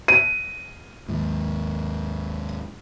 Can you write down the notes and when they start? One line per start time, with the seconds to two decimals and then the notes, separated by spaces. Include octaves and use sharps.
0.08 D#7
1.09 D#2 G#2